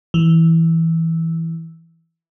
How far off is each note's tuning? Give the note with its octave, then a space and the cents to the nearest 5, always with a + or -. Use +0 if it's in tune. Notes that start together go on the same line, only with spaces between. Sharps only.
E3 -10